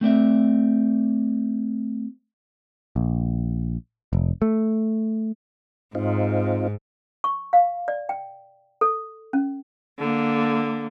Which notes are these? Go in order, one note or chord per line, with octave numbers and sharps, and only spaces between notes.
A3 C4 D5 E5
A#1
F1
A3
G#2 C4 D#4 F4
C#6
F5
D5
G5
A4
C#4
D3 A#3